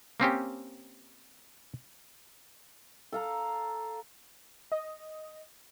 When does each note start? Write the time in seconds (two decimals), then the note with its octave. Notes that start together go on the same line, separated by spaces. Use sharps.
0.20 A#3 C4 C#4 G4
3.12 A4 F5 A#5
4.72 D#5